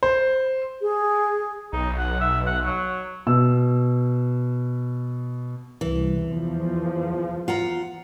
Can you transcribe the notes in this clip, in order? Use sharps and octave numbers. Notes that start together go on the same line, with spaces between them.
C5
G#4
B1 D#4
F#5
E5
F#5
F#3
B2 E6
C2 E3
E2 F3
F4 F#5 A#5